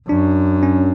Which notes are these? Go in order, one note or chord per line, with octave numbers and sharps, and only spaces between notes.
F#2 D4
C#4